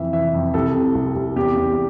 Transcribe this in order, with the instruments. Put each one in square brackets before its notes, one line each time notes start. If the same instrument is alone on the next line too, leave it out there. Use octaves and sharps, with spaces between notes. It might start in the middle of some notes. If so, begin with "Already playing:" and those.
Already playing: [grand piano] F2 E3 E5
E3 E5
F2
C2 A4
C3
C2
C2
E2 G4
E2